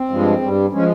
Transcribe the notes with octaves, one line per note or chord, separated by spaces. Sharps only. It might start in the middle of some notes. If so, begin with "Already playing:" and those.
Already playing: C4
G2 F3 G#3
G2 G3
F3 G#3 C#4